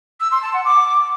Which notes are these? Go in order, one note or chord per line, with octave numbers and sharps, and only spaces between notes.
E6
C6
A5
F#5
D6